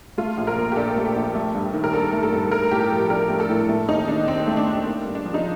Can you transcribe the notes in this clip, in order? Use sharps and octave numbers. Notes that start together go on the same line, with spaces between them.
A3 F4
A#1
A#4
A#2
G4
D4 A4
A3
G4
A#1
A3
G2
D#3
A#4
G2 A4
A3
A4
G2
A3 A#4
A2 G4
A4
F3
D4 A#4
A3
A4
A2
A3
D#2 D#4
D#3 D4
D#2 C4
A3
D4
D#2
A#3
G2
D4
F3
D#4